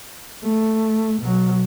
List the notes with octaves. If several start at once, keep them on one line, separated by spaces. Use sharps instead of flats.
A3
B2 F#3